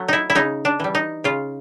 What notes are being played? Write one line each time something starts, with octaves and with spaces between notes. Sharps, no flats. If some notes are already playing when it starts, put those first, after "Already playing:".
Already playing: F#3 A3
D#4 E4
E4
C#3 D#4
D4
E3 G3
D#4
C#3 F4